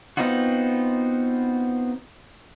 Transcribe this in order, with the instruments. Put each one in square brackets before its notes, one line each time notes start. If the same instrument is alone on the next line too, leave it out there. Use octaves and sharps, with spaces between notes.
[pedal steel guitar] B3 C4 D#4 F4 F#4